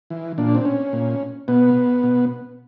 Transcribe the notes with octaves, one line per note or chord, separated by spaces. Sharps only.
E3
A#2 D4
C4
C#4
A#2
B2 B3
B2